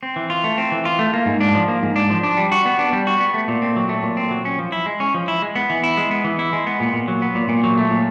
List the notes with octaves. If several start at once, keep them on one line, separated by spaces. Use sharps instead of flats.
C4
E3
F4
A3
C4
E3
F4
A3
A#3
G#2
D4
F3
A#3
G#2
D4
F3
D4
G3
F#4
B3
D4
G3
F#4
B3
A3
A#2
C4
F#3
A3
A#2
C4
F#3
C#4
F3
E4
G#3
C#4
F3
E4
G#3
B3
E3
E4
G#3
B3
E3
E4
G#3
B3
A#2
A#2
F#3
B3
A#2
A#2
F#3
A3
A#2